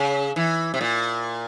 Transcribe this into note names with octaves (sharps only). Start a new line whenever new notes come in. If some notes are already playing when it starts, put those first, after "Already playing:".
Already playing: C#3
E3
C3
A#2